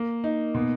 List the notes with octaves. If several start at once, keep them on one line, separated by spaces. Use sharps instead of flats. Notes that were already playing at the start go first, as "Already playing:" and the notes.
Already playing: A#3
D#4
B2